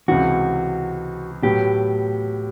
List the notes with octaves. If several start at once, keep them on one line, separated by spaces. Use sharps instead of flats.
C#2 C3 E3 F#4
A2 F#3 B3 G4